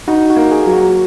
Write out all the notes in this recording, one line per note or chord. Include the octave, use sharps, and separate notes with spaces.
D#4 F#4
F#4
A#3
G#4
F#3
F#4